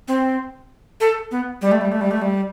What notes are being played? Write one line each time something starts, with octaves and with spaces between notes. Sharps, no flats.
C4
A4
B3
G3
A3
G3
A3
G3
A3
G3